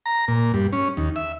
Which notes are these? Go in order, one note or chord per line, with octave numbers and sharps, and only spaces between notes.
A#5
A#2
G2
C#4
D#2
E5